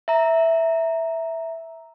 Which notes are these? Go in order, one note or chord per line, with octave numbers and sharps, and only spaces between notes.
E5 A#5